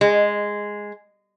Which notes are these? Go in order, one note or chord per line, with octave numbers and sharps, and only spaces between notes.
G#3